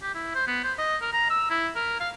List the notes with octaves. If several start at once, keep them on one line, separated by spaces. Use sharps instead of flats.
G4
E4
C5
B3
C5
D#5
A#4
A#5
E6
E4
A#4
F5